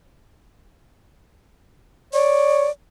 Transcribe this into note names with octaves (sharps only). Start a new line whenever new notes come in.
C#5 D5